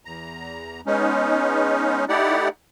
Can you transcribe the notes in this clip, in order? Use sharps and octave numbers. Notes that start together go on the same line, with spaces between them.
E2 A#5
G#3 B3 C#4 D#4
A3 D#4 E4 G4 D5 F#5